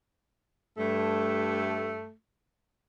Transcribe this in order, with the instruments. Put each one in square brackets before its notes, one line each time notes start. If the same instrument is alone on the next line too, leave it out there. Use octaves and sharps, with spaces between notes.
[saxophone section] G2 A3